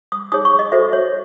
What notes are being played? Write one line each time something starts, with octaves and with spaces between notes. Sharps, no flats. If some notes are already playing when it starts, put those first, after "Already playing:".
D#6
D#4 G#4 C#5 D#6
C#6
D#5
F#4 A4 C5 E5
C#5